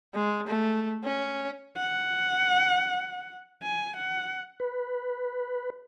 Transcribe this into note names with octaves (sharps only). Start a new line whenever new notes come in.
G#3
A3
C#4
F#5
G#5
F#5
B4